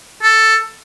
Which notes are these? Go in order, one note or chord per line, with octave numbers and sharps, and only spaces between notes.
A4